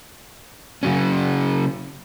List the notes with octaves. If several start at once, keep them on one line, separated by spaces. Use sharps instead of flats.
C#3 F#3 C#4